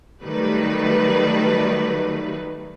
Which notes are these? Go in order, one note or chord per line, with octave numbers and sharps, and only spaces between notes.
D#3 F#3 G3 A3 B4